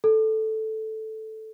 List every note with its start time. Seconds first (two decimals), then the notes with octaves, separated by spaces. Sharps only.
0.04 A4